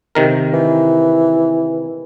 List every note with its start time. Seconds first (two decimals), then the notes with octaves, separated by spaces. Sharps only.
0.15 C3 D#3 A#4
0.53 E3